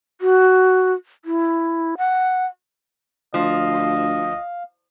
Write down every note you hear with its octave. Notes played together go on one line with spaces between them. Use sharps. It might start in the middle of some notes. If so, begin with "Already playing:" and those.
F#4
E4
F#5
D2 F3 D#5 F5